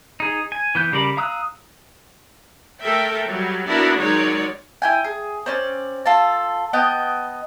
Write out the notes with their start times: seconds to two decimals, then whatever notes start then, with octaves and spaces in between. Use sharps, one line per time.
0.20 D#4 G#4
0.52 G#5
0.75 E3 B3 G6
0.92 C#3 G3 A#4 D5 B5
1.17 F5 A#5 D#6 E6 F#6
2.81 A3 A4 A#4 E5 G5
3.25 F#3 G3
3.67 B3 D4 E4 F#4 A#4
3.98 D#3 F#3 G#3 D#4 C#5 D5
4.82 E4 G5 G#5
5.04 G#4
5.46 C4 C#4 D5
6.06 F4 A4 A5
6.73 B3 D#5 G5 A5